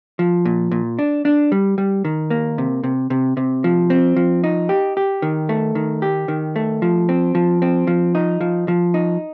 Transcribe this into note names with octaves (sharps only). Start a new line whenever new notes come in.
F3
A#2
A#2
D4
D4
G3
G3
D#3
A#3
C3
C3
C3
C3
F3
C4
F3
D#4
G4
G4
D#3
A3
D#3
G4
D#3
A3
F3
C4
F3
C4
F3
D#4
F3
F3
D#4